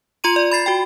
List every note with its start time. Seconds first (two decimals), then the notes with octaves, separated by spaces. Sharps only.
0.24 F4 C6 D#7
0.36 D5
0.51 B5 A6 C7
0.66 F#4 G5